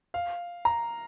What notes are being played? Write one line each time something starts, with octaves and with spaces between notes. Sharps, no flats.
F5
A#5